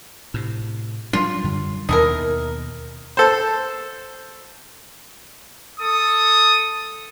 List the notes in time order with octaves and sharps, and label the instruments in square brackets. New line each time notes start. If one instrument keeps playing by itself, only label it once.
[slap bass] A2 C3
[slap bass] F#3 G3 D4 [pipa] F4
[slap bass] F#2 D3 G3
[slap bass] D#2 B2 [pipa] D#4 E4 A#4
[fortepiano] A4 C5
[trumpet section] A4 D#6